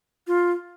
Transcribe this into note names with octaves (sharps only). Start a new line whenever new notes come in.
F4